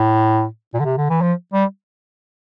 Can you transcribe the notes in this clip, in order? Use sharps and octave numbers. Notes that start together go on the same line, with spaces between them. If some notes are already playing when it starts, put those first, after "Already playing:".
Already playing: A2
A#2
D3
C3
D3
E3
F3
G3